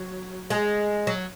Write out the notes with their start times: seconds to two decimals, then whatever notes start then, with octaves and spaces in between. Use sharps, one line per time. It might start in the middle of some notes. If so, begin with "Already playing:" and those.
Already playing: F#3
0.50 G#3
1.07 F#3